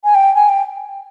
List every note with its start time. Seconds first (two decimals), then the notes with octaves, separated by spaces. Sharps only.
0.04 G#5
0.15 G5
0.35 G#5
0.49 G5